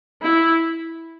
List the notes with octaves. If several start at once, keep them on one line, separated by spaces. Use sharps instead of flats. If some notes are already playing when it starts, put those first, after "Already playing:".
E4